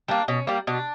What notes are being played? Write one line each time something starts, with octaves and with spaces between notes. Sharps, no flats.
G3 A#3 D4
B2 C#4
G3 A#3
B2 D4